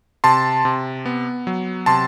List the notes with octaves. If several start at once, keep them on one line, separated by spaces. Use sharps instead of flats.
C3 A5 C6
C3
B3
F#3
C3 A5 C6